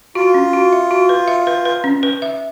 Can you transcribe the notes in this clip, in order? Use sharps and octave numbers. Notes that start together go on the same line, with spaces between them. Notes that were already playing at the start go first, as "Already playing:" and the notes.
F4 F#4
C#4
F#4
E5
F#4
B4
E5
B4
B4
C#4
B4
E5